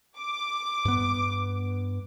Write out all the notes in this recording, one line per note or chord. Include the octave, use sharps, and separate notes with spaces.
D6
G2 B3